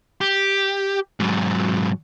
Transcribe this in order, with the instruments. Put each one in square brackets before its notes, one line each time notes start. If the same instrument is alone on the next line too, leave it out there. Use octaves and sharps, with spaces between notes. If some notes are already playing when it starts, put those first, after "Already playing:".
[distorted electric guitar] G4
G#2 F#3